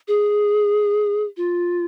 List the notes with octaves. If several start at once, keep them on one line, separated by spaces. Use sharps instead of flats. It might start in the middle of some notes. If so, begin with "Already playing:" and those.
G#4
F4